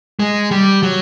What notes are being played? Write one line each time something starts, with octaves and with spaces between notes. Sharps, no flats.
G#3
G3
F#3